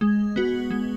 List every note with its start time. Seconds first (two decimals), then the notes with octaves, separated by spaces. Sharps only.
0.01 G#3
0.36 B3 F#4
0.71 G#3